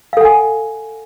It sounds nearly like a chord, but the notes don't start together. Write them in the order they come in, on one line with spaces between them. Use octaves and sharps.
F5 A4 F#5 G#5